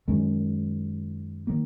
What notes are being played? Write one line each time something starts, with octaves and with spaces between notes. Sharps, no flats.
F#2 D#3 G#3 C#4
D#3 A#3